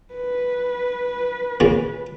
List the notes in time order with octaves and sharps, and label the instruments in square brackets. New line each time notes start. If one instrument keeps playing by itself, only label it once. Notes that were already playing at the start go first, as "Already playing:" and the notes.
[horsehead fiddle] B4
[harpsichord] A#2 C#3